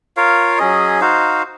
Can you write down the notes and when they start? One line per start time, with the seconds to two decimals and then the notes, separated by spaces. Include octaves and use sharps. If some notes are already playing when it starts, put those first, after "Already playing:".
0.17 F4 A#4 C#5 F5
0.58 F#3 C#4 G#4 D#5
1.00 D#4 F#4 C5 F5